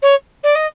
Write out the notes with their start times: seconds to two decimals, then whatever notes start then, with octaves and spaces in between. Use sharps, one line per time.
0.02 C#5
0.43 D5
0.55 D#5